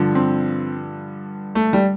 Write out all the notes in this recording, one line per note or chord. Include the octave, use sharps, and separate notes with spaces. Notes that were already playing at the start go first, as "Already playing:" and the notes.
Already playing: G2 D3 F3
C4
A3
G3